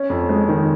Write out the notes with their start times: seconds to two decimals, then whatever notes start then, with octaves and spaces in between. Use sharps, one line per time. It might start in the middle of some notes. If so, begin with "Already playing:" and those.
Already playing: C#4
0.10 F2
0.29 G#3
0.49 D#3